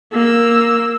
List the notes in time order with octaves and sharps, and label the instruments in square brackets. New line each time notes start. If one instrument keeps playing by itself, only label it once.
[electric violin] A#3 E6